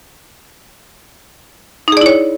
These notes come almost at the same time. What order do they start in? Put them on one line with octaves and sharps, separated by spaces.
D#4 G#4 D5 E4 C#5